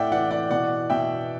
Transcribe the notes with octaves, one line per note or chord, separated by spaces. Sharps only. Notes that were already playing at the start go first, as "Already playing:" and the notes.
Already playing: A2 D5 E5 F#5 G5
E3 D5 F#5
D5 F#5
B2 D5 F#5
B2 E5 G5